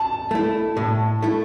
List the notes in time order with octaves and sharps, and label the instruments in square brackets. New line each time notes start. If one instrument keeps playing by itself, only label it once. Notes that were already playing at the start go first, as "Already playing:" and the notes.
Already playing: [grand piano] A5
[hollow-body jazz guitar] A3 E4
A2
A3 E4